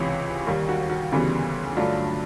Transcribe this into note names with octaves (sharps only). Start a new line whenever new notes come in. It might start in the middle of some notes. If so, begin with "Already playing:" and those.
Already playing: C#2 C3 E3 C#5
D#2 D#3 G3
F#4
F#4
D2 C#3 E3 G3 B3
G2 D3 F#3 A3 D4 F4